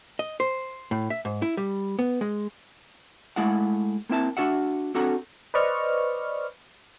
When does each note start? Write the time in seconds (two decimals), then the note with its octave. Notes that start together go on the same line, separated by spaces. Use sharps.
0.19 D#5
0.40 C5
0.91 A2
1.10 E5
1.25 G#2
1.42 E4
1.57 G3
1.99 B3
2.21 G#3
3.36 G#3 A3 E4 F5 F#5
4.09 A#3 C4 E4 E5 A5
4.37 D4 F#4 E5 F#5
4.95 C4 D4 F#4 A4 F#5 A#5
5.54 B4 C5 D5 D#5 C#6 F6